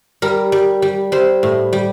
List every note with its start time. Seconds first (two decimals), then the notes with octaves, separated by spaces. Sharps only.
0.22 G3 A#4
0.52 G3
0.82 G3
1.12 G3 C5
1.43 A2
1.73 G3